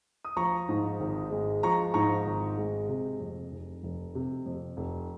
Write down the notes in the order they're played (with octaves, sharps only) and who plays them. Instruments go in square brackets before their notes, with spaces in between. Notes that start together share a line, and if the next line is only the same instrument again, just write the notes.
[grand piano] D#6
F3 A#5 C#6
G#2
G#1
G#3
F3 A#5 C#6
G#2 A#5 C#6
G#1
G#3
C3
F2
F1
F1
C3
F2
F1